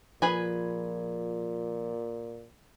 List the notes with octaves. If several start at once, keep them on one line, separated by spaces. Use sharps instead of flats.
A#2 F3 G#4 B4 G#5